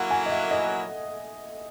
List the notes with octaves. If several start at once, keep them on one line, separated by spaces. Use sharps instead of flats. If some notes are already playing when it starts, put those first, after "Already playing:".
Already playing: F#3 A#3 E4 F#5
G#5
D#5
E5
D#5